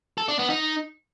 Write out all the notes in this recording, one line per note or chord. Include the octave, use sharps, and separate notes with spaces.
A4
D4
B3
D#4